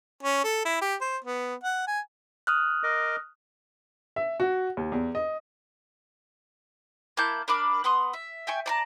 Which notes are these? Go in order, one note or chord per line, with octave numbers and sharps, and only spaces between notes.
C#4
A4
E4
G4
C5
B3
F#5
G#5
D#6 F6 F#6
A#4 D#5 D6
E5
F#4
D#2
E2
D#5
A#3 E4 A5 G6
D4 A#4 B5 D6
B3 F#5 C6 D#6
E5
E5 G5 G#5 C#6
D5 A5 A#5